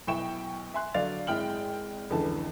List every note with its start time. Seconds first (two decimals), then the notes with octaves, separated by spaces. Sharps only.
0.07 B1 B2 E4 G5 C#6 E7
0.74 E5 G#5 C6 F#6
0.94 D3 F#3 D5 F5 A6 F7
1.27 G#1 G#3 E4 G5 F6 F#7
2.10 F1 C#2 D3 E3 A5